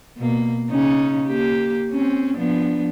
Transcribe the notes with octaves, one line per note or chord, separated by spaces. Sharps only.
B2 A#3
C#3 C#4 D#4
A#3 G4
C4 C#4
F3 B3 D4